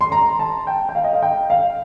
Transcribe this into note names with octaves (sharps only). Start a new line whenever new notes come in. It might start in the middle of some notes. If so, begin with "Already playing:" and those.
C6
A#5
A5
G5
G5
F5
D#5
F5
G5
F5